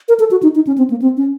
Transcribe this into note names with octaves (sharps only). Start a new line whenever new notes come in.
A#4
A4
F#4
D#4
D#4
C#4
C4
A#3
C4
C#4